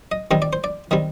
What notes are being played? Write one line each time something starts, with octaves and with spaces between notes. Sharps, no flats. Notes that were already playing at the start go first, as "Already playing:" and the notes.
D#5
D#3 G3 C4 D#5
D5
C5
D5
D#3 G3 C4 D#5